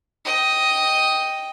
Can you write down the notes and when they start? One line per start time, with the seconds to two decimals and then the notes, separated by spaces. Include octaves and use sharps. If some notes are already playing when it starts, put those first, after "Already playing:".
0.25 D#5 G5